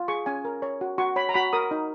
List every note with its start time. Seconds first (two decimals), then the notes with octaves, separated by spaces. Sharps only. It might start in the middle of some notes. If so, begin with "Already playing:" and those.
Already playing: F4
0.08 G#4 C#6
0.26 C#4 G#5
0.45 A#4
0.62 C#5
0.81 F#4
0.98 F#4 C#6
1.16 C#5 B5
1.29 A#5
1.34 F#4 B5
1.53 A#4 D#6
1.71 D#4